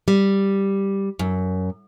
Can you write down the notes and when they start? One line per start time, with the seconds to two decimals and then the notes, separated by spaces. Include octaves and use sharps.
0.08 G3
1.19 F#2